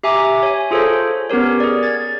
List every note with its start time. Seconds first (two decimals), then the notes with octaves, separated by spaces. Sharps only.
0.03 G4 E5 G#5 A#5 D6
0.43 C#5 G#5
0.71 F4 G#4 A4 C5 C#5
1.30 B3 C#4 G4 A#4 C#5
1.60 G#4 D5
1.83 G#6 A6